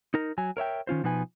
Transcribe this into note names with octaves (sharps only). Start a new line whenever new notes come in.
D#4 A#4
F#3 G#5
A#4 C#5 E5 G5
D#3 C#4 F4 C5
B2 F3 D#4 B4 G#5